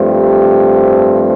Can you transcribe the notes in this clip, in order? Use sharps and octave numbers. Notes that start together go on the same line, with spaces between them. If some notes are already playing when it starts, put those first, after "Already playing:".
Already playing: G2 F3 A3 C4
G4